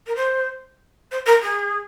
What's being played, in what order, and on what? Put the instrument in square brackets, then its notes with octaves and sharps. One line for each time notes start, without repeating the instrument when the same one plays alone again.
[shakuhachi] A#4
C5
C5
A#4
G#4